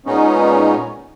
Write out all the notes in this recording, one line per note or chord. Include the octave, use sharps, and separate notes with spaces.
A#2 G#3 B3 C#4 D#4